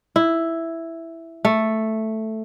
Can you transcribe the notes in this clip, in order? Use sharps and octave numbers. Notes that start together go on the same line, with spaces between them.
E4
A3